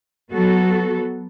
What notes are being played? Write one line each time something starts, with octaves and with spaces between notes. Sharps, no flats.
F#3 B3 F#4 A4